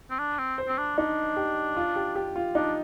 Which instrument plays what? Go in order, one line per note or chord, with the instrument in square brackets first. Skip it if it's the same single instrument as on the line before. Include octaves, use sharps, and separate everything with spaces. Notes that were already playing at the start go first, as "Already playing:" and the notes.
[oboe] C4
D4
C4
[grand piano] C5
[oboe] C4
D4
[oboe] D4 [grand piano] D#4
[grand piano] G4
F4
G4
G4
F4
[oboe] D4 [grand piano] D#4